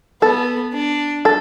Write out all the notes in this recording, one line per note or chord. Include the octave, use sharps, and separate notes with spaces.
B3 A4
D4
A4